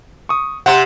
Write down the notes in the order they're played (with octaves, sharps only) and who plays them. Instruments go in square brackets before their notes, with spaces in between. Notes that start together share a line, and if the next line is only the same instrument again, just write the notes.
[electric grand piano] C#6 D#6
[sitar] C3 [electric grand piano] F#5 C6